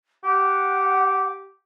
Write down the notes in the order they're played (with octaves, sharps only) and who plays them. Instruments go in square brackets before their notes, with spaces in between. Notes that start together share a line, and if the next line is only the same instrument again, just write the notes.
[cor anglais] G4 [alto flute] F#5